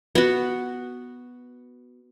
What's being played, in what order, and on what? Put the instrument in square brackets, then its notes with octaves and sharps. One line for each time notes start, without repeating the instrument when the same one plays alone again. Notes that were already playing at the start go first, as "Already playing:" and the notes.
[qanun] B3 F#4